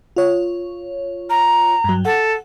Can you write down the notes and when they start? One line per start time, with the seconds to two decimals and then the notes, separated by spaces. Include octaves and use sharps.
0.16 F4 C#5
1.30 A#5
1.84 G2 F#3
2.05 A4 F#5